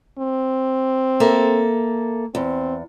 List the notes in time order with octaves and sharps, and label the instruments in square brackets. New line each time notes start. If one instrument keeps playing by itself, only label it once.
[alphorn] C4
[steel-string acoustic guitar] A#3 A4 E5
[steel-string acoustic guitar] E2 [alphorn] C4